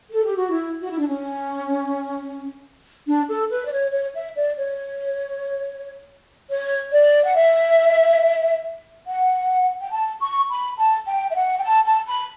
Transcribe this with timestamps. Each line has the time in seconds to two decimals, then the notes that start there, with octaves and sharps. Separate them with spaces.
0.11 A4
0.24 G4
0.36 F#4
0.50 E4
0.81 F#4
0.90 E4
0.99 D4
1.07 C#4
3.07 D4
3.29 A4
3.50 B4
3.66 D5
3.71 C#5
3.92 C#5
4.14 E5
4.36 D5
4.57 C#5
6.50 C#5
6.93 D5
7.24 F#5
7.35 E5
9.07 F#5
9.82 G5
9.92 A5
10.21 C#6
10.50 B5
10.78 A5
11.07 G5
11.31 E5
11.35 F#5
11.57 G5
11.64 A5
11.85 A5
12.06 B5